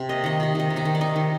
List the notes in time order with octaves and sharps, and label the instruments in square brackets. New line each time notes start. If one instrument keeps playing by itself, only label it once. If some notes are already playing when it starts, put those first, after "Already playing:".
Already playing: [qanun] C3
A#3 D#5
D#3 D#5
C3 D#5
D#3 D#5
D#3
D#4 D#5
D#3
D5
D#3 D#4 D#5
D#3